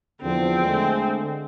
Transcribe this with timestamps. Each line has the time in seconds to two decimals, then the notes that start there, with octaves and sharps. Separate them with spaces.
0.22 E2 D3 F3 C4
0.64 D3 G#3 A3